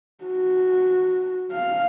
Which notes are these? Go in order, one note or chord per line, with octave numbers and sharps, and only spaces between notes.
F#4
F5